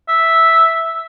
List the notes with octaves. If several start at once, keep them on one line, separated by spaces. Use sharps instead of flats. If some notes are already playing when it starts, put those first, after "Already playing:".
E5